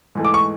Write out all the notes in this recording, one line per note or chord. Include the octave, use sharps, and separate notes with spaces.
G#2 E3 A3
D6
C#6